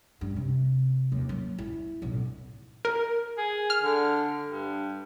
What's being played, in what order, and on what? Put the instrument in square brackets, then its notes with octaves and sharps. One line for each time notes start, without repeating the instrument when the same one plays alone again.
[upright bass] G2
C3
D#2
F#3
E4
D1 B1
[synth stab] A#4
[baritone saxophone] G#4
[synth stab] F6
[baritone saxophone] D3
G2